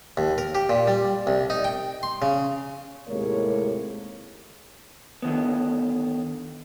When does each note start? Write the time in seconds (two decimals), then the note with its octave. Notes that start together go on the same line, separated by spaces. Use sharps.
0.17 D#2
0.38 A#4
0.55 G4
0.70 A#2
0.87 G3
1.27 C2
1.50 D#4
1.64 G5
2.03 C6
2.22 C#3
3.08 D#2 A2 C3 G#3 A#3 C#5
5.22 D3 D#3 B3